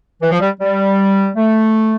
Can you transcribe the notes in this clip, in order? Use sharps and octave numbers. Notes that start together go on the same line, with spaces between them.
E3
F3
G3
G3
A3